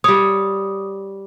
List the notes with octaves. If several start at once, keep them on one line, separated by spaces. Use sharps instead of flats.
G3 C#5 D#6